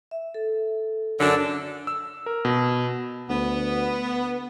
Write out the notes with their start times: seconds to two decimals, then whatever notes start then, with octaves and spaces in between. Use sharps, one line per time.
0.11 E5
0.34 A4
1.20 F#2 D3 D4
1.87 E6
2.26 A#4
2.45 B2
3.29 D2 B3